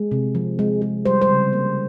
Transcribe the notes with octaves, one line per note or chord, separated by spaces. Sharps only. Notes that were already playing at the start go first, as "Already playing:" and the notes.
Already playing: G#3
C3
F3
G#3
G#3
G3 C5
C5
C#3
A#3